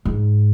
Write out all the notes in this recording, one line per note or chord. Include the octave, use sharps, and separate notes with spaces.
G#2